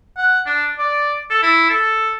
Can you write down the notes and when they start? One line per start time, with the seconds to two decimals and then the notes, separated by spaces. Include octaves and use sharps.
0.18 F#5
0.46 D4
0.79 D5
1.30 A4
1.43 E4
1.70 A4